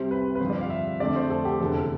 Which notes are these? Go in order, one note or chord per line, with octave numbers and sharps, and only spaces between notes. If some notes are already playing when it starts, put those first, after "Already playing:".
Already playing: C2 C3 G3 C4 C5
B4
B4
G2 D3 F3 C4 C5
D5
F5
E5
F2 D3 A3 D5
C5
A4
G4
F1 E2 D3 A4